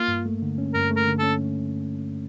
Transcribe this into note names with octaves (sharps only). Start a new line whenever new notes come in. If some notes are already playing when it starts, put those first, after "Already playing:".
Already playing: A#3 F4
G2
A3
D3
C#4
G2 A#4
A3
A#4
D3
C#4 A4